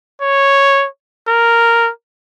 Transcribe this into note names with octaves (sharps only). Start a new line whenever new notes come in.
C#5
A#4